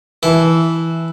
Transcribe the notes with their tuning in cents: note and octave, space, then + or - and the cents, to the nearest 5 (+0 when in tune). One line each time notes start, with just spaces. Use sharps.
E3 -5 A5 -25